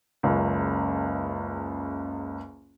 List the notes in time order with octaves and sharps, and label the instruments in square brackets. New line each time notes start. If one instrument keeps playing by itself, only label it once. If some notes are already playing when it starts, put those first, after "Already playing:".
[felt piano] F#1 C#2